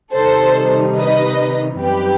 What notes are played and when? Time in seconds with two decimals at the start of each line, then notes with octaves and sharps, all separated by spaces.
0.14 C3 D#3 G3 D#4 A4 C5
0.97 B4 D#5
1.81 F#2 E3 G3 C4 D#4 G4 B4